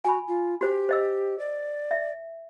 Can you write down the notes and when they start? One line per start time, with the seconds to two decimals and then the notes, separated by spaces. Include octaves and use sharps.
0.05 F#4 G#5 B5
0.28 F4
0.61 F#4 G4 C5
0.89 C5 D#5 E6
1.39 D5
1.91 E5